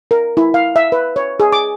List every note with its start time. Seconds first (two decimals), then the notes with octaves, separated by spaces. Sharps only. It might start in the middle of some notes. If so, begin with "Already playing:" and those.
0.11 A#4
0.37 E4
0.54 F5
0.76 E5
0.92 B4
1.16 C#5
1.40 G#4
1.52 D6